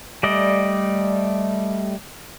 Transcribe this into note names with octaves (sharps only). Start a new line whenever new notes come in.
G3 A3 D5 D#5